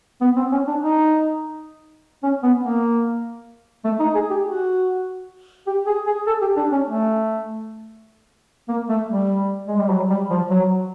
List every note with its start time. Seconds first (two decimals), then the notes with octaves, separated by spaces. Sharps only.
0.21 B3
0.36 C4
0.52 C#4
0.67 D4
0.82 D#4
2.23 C#4
2.43 B3
2.63 A#3
3.85 A3
4.00 D#4
4.15 G#4
4.30 G4
4.46 F#4
5.67 G4
5.87 G#4
6.07 G#4
6.27 A4
6.42 G4
6.57 D4
6.72 C#4
6.87 A3
8.69 A#3
8.89 A3
9.09 G3
9.68 G#3
9.79 G3
9.90 F#3
10.10 G3
10.30 F3
10.50 F#3